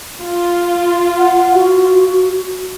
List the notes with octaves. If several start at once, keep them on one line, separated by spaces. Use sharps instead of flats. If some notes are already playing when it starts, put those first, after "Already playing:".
F4
F#5
F#4